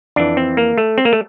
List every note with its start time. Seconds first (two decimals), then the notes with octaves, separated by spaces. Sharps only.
0.16 F2 E3 D4
0.37 C4
0.57 A#3
0.78 A3
0.98 C4
1.05 A#3
1.13 A3